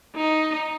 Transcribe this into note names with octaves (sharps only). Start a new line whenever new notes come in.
D#4